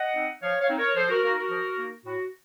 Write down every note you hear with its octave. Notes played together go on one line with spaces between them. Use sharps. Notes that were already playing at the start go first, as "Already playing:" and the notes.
Already playing: D#5 F#5
C4 D#4
F3 C#5 F5
C#5 F5
C4 D#4
A#4 C#5
F3 A4 C5
F#4 A#4
A#3 D#4 F#4 A#4
F#4 A#4
F3
A#3 D#4
A2 F#4